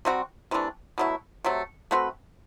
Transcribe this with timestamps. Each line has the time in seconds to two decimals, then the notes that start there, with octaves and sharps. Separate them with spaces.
0.05 C3 G3 C4 F#4
0.51 C3 E3 A3 D4
0.98 B2 F#3 A3 E4
1.45 C3 F#3 A3
1.91 A3 C4 F#4 B4